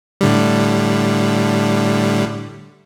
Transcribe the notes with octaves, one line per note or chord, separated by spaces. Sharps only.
A2 D3 G3